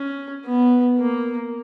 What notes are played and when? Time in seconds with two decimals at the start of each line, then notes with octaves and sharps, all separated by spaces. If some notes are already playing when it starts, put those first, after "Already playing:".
Already playing: C#4
0.46 B3
0.99 A#3